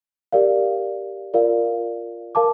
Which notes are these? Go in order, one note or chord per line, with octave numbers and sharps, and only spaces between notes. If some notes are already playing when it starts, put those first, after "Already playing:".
G4 A#4 D5 F5
F4 A#4 D5 F5
A#4 F5 A5 D6